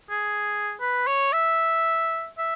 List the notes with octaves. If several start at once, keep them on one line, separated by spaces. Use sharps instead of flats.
G#4
B4
C#5
E5
E5